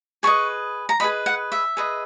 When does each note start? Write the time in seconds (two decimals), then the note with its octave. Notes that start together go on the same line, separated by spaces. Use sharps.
0.23 G#4 B4 D#5 C#6
0.89 A#5
1.00 G#4 B4 D#5 B5
1.26 F#5
1.52 E5
1.77 G#4 B4 D#5